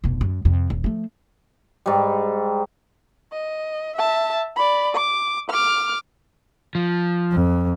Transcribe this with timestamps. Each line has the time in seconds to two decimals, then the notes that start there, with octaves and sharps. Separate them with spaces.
0.04 F1 B2
0.21 F#2
0.45 F2 C3
0.70 E1
0.84 F3 A3
1.86 G#2 G3
3.32 D#5
3.97 E5 A5
4.56 D5 B5
4.95 D6
5.51 D6 F6
6.75 F3
7.32 F2